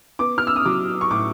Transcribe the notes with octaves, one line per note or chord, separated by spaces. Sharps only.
B3 D6
F6
E6
D#6
F#3 D6
C#6
A2 D6